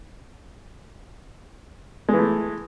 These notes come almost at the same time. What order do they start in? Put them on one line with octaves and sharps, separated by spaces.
G#3 E3 A3